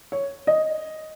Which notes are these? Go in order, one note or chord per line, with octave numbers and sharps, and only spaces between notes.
C#5
D#5